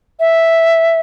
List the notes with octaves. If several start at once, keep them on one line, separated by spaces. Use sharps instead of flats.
E5